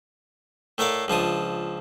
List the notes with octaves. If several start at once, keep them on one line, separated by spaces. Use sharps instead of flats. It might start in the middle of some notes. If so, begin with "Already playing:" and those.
A2 A3 A#4 D5 F5
C#2 F3 D4 D#6